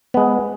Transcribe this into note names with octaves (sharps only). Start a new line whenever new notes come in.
G#3 B3